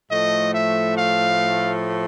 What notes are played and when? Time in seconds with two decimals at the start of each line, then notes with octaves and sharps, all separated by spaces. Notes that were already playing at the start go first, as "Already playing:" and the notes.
0.10 A2 F3 A3 D#5
0.54 E5
0.97 F5